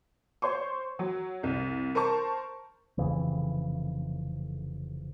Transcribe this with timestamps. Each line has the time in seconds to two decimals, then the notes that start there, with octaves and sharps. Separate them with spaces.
0.42 C5 C#5 C6 C#6
0.99 F#3
1.43 C2
1.95 A#4 C5 A5 C#6
2.98 F1 F2 C#3 E3